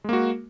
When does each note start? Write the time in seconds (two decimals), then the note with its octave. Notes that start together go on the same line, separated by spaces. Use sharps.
0.04 G#3
0.09 A#3
0.13 F#4